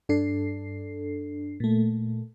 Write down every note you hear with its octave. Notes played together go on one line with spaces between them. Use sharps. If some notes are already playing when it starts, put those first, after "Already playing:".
G2 D4 A4 C7
A#2 A3